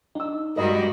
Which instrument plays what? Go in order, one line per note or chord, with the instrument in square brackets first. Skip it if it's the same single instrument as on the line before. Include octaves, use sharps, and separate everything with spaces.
[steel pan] D4 E6 [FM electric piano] D#4
[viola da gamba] G2 G#3 F#4 [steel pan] A#4 D#5 B5